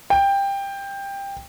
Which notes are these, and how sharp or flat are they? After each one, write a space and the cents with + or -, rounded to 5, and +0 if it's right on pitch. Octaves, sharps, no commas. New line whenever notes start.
G5 +15